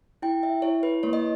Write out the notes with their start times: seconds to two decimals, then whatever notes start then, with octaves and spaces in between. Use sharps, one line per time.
0.22 E4 G5
0.43 E5
0.62 E4 C#5
0.83 B4
1.03 A#3 C#5
1.13 D#5